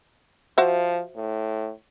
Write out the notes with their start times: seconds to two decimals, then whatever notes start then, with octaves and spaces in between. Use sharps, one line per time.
0.58 F3 F#4 C5 E5
1.16 A2